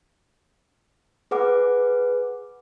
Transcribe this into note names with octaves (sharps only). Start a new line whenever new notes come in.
G#4 B4 F#5 D6